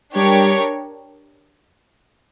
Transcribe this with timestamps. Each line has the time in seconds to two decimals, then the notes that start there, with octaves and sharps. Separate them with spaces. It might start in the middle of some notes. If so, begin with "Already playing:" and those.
0.15 G3 D4 G4 A#4 C#5